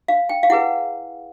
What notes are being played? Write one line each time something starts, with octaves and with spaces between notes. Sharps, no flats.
F5
G5
F5
E4 G#4 B4 F#5